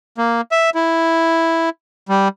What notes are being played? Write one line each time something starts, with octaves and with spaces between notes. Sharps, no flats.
A#3
E5
E4
G3